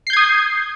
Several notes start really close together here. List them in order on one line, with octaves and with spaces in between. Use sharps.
C7 G6 G#6 D#6